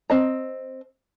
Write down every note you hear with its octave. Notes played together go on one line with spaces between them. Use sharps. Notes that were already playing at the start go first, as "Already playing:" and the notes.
C4 D#5 A#5